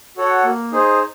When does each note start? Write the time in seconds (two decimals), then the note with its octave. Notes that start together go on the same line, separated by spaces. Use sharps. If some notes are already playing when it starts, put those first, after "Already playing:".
0.17 F#4 A4 C#5 F#5
0.44 A#3
0.72 D#4 G#4 C5